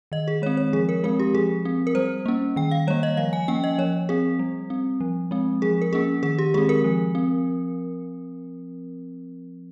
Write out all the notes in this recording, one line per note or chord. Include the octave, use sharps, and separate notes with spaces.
D#3 D#5
G#4
G#3 C4 C#5
C#5
F3 G#4
A#4
G#3 C4 A#4
G4
F3 G#4
C4
A#4
G3 C5
A#3 C#4
D#3 G5
F5
G3 A#3 C#5
D#5
F3 F5
G#5
A#3 C#4 G5
D#5
F3 C#5
C4 G#4
G3
C4
F3
G#3 C4
F3 G#4
A#4
A#3 C#4 G#4
D#3 G#4
G4
G#3 C4 G#4
A#4
F3
C4